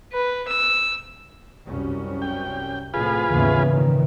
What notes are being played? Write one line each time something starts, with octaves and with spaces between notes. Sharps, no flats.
B4
E6
C2 F#2 C#4
G5
A2 C3 F3 F4 G#4 B4
D#2 G#2 C#3 E3 B3 C#4
A#2 D#3